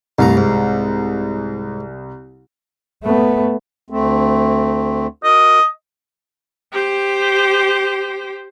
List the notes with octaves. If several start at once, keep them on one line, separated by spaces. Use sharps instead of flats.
C2 G2 A3 A#5
G#2
A3 B3
D2 A3 C4
F#4 A#4 D#5
G4 C5